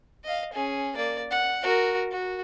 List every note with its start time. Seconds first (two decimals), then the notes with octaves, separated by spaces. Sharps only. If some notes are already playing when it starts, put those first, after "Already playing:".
0.24 D#5 F5
0.53 C#4 G#4
0.96 A#3 D5
1.31 F#5
1.63 F#4 A#4
2.11 F#4